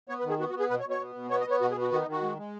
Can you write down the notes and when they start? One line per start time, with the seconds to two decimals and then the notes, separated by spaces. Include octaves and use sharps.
0.09 B3 C#5
0.20 B4
0.24 D#3
0.30 G#4
0.39 B3 F#4
0.50 F#4
0.55 B3
0.60 G#4
0.70 B2 B4
0.80 C#5
0.85 B2
0.90 C#5
1.00 B3
1.15 B2
1.31 B3 C#5
1.41 D#5
1.46 B3 C#5
1.61 B2 F#4
1.71 G#4
1.76 B3
1.81 F#4
1.92 D#3 F#4
2.02 D#4
2.07 D#3
2.12 F#4
2.22 G#3
2.37 G#3